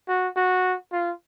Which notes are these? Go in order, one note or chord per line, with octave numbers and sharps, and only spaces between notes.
F#4
F#4
F4